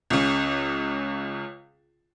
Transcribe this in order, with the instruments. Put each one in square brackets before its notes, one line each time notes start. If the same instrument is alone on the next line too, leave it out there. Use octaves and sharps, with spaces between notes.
[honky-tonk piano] C#2 C#3